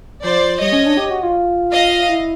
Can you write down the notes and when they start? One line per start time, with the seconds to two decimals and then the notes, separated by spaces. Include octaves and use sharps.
0.23 F3 C5 D5
0.60 G3 C#5 D#5
0.72 C#4
0.86 D4
0.97 G4
1.11 F#4
1.23 F4
1.72 D#5 F5
2.09 E4